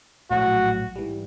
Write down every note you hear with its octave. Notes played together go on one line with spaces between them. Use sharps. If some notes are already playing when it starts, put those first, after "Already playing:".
A#1 A2 F#3 A3 F#4
G#2 E3 G3